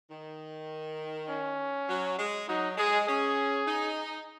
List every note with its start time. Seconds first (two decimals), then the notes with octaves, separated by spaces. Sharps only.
0.11 D#3
1.29 C#4
1.88 F#3
2.18 G#3
2.48 F#3 D#4
2.77 G#3 G#4
3.07 C#4 G#4
3.68 D#4